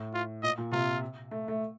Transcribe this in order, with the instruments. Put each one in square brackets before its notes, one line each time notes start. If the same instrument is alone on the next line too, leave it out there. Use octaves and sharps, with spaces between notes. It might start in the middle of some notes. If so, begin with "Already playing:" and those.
Already playing: [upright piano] A2
[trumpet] F4
[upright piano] A#2 [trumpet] D#5
[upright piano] A#2
[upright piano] C3 [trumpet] F4
[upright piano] A3
A3